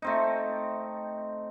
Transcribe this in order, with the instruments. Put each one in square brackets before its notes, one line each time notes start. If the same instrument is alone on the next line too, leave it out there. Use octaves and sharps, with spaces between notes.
[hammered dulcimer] A3 C4 D#4